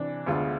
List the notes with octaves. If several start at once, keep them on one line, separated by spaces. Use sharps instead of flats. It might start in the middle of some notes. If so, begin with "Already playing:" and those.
Already playing: C3 E3 D4
D2 D3 G#3 B3 F4